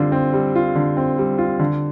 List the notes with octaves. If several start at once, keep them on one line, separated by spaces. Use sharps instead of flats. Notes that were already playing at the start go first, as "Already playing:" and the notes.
Already playing: D3 G3 C4 F4
C4
G3
F4
D3
C4
G3
F4
D3